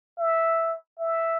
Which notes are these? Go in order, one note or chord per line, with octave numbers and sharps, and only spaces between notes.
E5
E5